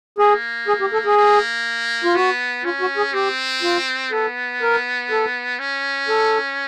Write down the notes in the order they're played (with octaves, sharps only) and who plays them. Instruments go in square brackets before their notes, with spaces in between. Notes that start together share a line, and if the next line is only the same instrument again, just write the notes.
[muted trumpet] A#3 [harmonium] G#4
[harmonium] G#4
G4
A4
G#4
[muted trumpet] A#3
[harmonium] F4
[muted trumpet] B3 [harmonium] F#4
[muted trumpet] C#4 [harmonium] F4
[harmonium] F#4
G#4
[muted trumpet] C4 [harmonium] G4
[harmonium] F4
[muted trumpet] B3 [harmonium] A4
[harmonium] A#4
A4
[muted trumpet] C#4
[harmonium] A4